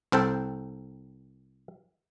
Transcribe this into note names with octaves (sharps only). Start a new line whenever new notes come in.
C2 C4 A4 G5